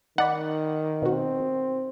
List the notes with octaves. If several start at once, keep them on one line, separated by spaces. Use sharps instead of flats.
D#3 D#4 D5 F#5 B5
B2 C4 F#4